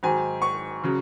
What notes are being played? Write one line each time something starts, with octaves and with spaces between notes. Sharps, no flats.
G#2 D#3 F#3 G#5
C#6
C#3 F#3